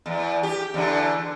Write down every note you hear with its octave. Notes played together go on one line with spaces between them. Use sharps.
E2
G4
E2 D3